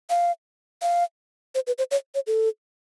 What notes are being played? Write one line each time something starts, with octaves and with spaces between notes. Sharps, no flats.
F5
F5
C5
B4
C5
C#5
C#5
A4